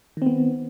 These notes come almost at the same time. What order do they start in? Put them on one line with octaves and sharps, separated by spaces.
D#3 C4 B3